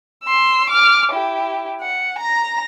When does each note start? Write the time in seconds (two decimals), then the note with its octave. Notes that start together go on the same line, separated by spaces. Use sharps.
0.24 C6 E6
0.70 D6 F6
1.12 E4 G4
1.81 F#5
2.19 A#5 A#6